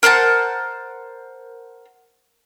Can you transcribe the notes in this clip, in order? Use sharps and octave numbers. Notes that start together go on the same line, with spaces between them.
A#4 C5 F#5 A5